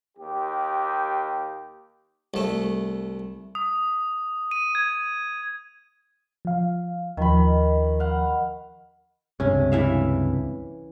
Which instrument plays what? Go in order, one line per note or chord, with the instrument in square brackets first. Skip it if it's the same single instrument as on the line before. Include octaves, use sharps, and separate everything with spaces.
[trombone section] D#2 G4
[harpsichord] C2 A3
[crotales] D#6
D#7
G#6
[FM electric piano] F3 F5
[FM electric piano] D#2 F3 [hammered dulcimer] D#3 B5
[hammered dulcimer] F5 F#5
[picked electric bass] C#2 G2 C3 [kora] C#4
[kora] E3 E5 F5